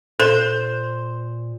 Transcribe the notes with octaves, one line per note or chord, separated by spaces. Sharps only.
A#2 A4 C5